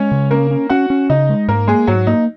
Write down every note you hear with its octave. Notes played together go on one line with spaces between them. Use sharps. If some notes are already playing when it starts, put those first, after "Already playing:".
Already playing: G#3 C#4 C#5
C#3
A#3 C#4 A#4
C#4
C#4 F#4 F#5
C#4
C#3 D#4 D#5
G#3
G#2 A#3 A#4
G#3 A#3 G#4
G#2 F#3 F#4
A#3 D#4